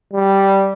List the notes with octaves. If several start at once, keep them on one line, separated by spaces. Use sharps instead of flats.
G3